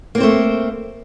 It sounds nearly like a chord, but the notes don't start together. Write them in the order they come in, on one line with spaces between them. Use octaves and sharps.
A#3 C4 C5 A3